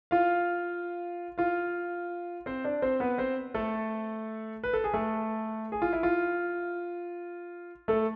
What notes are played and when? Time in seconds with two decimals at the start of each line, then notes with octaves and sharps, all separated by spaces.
0.11 F4 F5
1.38 F4 F5
2.46 C4 C5
2.64 D4 D5
2.82 C4 C5
3.00 B3 B4
3.18 C4 C5
3.54 A3 A4
4.64 B4
4.73 A4
4.84 G#4
4.94 A3 A4
5.72 G#4
5.82 F4
5.93 E4
6.03 F4
7.88 A3 A4